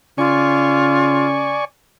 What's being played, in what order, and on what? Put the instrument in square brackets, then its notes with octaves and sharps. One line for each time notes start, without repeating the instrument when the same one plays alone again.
[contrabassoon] C#3 [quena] F4 [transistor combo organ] D5 G#5 C#6